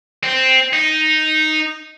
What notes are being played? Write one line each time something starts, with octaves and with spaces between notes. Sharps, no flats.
C4
D#4